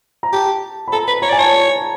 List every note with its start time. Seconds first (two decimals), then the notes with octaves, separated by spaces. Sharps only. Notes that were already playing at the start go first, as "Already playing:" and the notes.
0.23 A#5
0.32 G4 A5
0.88 B5
0.92 A4 A#5
1.07 B4 B5
1.22 C#5 A#5
1.30 D5 G#5
1.38 C#5 A5